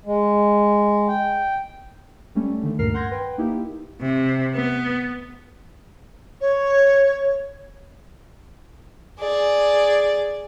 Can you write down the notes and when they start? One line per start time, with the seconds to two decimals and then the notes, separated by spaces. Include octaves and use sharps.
0.05 G#3
1.08 G5
2.35 G3 A3 C#4
2.63 D3 D#3 A3
2.79 D2 G2 A#2 A#4 F6 C7
2.94 F#5 C6 G6 G#6 A#6
3.11 B4 G5
3.38 A#3 D#4 E4 G4
4.01 C3
4.54 B3
6.40 C#5
9.20 G#4 D5